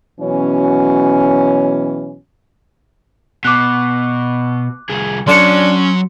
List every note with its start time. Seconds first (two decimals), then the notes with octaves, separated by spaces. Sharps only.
0.20 B2 E3 F#3 C#4
3.45 B2 D6 F#6
4.90 C2 G#4
5.28 F#3 C#4 D4 C#5 C6 C#7